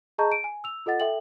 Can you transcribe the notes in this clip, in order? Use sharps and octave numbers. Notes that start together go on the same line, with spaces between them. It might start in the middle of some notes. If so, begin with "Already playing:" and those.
G#4 D#5 A5 A#5 C#6 G6
D7 D#7
G#5
E6 F7
F4 A4 D#5 F#5 A6
A4 E5 G5 F#7